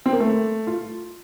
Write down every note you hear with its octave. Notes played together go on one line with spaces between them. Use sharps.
C4
A#3
A3
F4